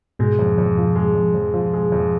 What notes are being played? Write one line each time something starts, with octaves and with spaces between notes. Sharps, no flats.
G#2 B2 G#3
F2
F2
F3
G#3
F2
F2
F3
G#3
F2